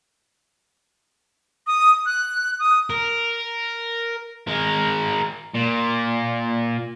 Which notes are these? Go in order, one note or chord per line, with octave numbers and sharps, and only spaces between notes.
D#6
F#6
D#6
A#4
G#3 A#4
A#2